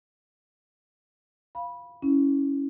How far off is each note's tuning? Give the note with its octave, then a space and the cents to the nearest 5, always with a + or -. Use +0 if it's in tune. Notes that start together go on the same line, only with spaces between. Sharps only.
F5 +0 B5 -15
C#4 +0 E4 -20